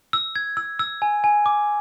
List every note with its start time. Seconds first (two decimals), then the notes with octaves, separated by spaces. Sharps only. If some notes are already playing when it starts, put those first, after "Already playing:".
0.13 E6
0.36 G#6
0.57 E6
0.79 E6
1.02 G#5
1.24 G#5
1.46 D6